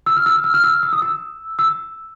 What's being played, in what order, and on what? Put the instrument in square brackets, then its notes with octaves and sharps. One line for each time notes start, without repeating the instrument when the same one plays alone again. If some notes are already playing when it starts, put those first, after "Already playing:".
[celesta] E6
F6
E6
F6
F6
E6
E6
D#6
E6
E6